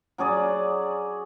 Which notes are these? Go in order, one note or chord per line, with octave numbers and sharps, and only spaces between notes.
F#3 C#4 G#4 D5